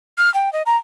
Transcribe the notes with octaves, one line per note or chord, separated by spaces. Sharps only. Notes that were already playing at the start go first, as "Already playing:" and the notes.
F6
G5
D#5
A#5